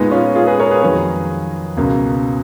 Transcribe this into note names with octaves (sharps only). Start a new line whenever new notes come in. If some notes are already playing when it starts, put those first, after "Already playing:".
Already playing: A#2 G#3 B3 D#4
C#4 F4
F4 G#4
G#4 B4
A#4 C#5
G#4 B4
F2 D#3 F#3 G#4 B4
C#2 B2 A#3